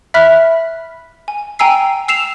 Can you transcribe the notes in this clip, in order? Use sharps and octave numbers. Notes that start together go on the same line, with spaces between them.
E5 B5 F6 F#6 B6
G#5
G5 G#5 A#5 E6 C7
E6 C7 E7 F7